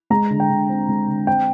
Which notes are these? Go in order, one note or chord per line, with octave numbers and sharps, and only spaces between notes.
G#3 A#5
D3
G5
D3
C4
G#3
D3
C4 G5